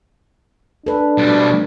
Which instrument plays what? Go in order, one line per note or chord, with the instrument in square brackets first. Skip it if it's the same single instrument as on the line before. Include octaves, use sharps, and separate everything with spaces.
[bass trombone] D4 [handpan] A4 B4
[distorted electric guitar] B2 G3